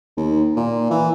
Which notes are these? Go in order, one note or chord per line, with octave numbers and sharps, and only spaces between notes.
D#2
A#2
E3